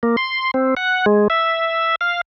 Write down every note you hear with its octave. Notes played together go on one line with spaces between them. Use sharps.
A#3
C6
C4
F#5
G#3
E5
F5